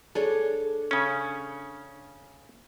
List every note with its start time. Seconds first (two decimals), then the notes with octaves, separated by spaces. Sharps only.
0.15 D4 G#4 A4 C#5
0.91 C#3 C#4